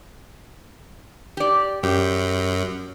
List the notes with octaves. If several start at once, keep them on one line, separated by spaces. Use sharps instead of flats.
G4 D5
F#2 G4